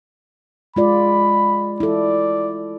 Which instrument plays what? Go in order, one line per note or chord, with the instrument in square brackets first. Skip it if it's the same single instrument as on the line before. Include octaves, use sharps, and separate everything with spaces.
[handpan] G#3 F4 D5 [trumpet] B5
[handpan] E4 A4 [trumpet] D5